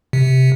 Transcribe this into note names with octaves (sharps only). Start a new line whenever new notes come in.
C3